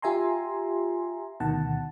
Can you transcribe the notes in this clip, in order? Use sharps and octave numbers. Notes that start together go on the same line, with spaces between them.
F4 G4 E5 G#5 A#5 C6
D2 B2 D#3 F#5 A5